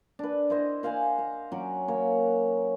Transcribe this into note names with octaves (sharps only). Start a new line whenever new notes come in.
D4 B4
E4 C5 D#5
C5 F5 F#5 G#5
A#5
F#3 C#4 F#4 D6
A#3 C#5